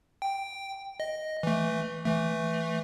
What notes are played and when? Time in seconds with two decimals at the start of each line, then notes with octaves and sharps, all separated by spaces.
0.22 G5
1.00 D#5
1.43 E3 A3
2.05 E3 A3